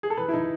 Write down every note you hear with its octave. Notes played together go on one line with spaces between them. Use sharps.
G#4
A4
E3 B4
E4
E3 D#4